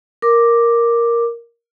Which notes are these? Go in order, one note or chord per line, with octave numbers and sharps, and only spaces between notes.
A#4 D6